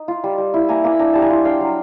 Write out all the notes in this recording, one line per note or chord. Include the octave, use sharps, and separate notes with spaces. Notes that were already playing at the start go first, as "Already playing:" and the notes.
Already playing: D#4
F4
G3
G3
E4
A#3 G#5 A#5
A#3 G#5 A#5
B5
D4 G#5 A#5
G3 A5
G#5 A#5
F4
D4 F5 G5
F#3